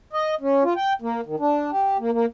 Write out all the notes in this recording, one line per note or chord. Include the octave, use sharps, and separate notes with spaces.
D#5
C#4
F4
G5
A#3
D#3
D4
G4
A#3
A#3